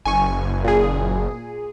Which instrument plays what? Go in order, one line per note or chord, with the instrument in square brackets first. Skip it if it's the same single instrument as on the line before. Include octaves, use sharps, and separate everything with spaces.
[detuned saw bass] F#1 [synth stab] G#5 C#6
[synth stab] A#2 G#4